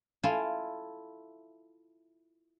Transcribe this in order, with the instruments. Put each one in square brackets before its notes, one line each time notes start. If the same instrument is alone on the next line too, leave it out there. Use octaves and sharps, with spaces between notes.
[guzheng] E4 F4 A4 F5 G#5